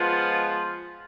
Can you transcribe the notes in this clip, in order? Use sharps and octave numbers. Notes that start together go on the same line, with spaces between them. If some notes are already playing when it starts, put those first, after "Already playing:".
Already playing: F3 G#3 B3 F4